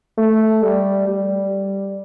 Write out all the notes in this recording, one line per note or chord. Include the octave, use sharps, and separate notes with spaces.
A3
G3
G3